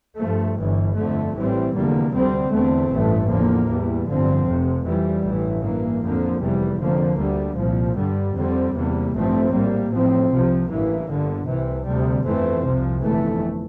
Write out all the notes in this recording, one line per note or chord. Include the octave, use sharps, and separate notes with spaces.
G2 F3 A3
G1 G2 E3
G1 F2 D3 A3
A1 A2 E3 G3 C4
F1 E2 D3 G3 A#3
D2 D3 G3 C4
E2 D3 A3 C4
A1 G2 E3 A3
E2 D3 F3 A#3
E2 E3 G3
G1 G2 D3 F3 C4
F1 F2 C3
F2 E3 G3
A1 G2 E3
G2 E3 A#3
F2 D3 F3 A#3
F1 E2 E3 G3
F2 D3 F3 A#3
D2 D3 G3
C2 A#2 F3
G2 D3 G3
F2 D3 G3 C4
E2 C3 G3 A#3
A1 G2 F3 A3 C4
A#1 A2 G3 A#3
A1 A2 F3 C4
C2 C3 F3
A1 G2 E3 A#3
G1 G2 D3
C2 C3 E3
D2 C3 G3
G1 F2 E3 A3 C4
C2 C3 F3
G1 F2 E3 A3